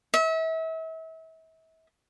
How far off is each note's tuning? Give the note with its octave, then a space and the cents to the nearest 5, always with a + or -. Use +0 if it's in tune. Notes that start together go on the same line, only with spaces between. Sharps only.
E5 -35